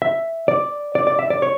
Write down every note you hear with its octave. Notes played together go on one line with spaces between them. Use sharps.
E5
D5
D5
D5
E5
D5
C#5